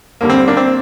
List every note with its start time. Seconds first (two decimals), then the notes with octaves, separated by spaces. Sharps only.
0.21 D#2 D3 G3 A#3
0.30 C4
0.48 A#3 D4
0.57 C4